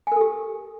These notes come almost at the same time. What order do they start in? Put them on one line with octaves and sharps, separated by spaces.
G#5 A#4 A4 G4